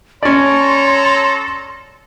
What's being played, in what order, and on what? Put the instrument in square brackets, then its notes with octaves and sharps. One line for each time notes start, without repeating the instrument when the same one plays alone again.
[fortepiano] C#4 D5 [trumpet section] A4 A#5 [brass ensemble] C#5 [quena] C6